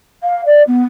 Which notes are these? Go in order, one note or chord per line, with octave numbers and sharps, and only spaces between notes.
F5
D5
B3